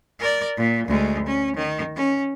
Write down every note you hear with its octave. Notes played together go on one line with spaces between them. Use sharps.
A#4 D5
A#2
D2 G#3
C#4
D#3
C#4